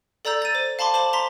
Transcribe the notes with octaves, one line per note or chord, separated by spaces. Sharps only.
A4 D5 A#5 E6 G6
A6 D#7
C5
F5 A5 B5 C6 D6
C5 B5 E7 F#7
A#5 C6 B6